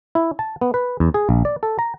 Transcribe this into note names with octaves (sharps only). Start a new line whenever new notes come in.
E4
A5
B3
B4
E2
G#4
A#1
D5
A4
A#5